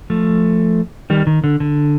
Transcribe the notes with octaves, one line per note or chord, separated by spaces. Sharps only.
F3 A3
D#3 G3
D#3
D3
D3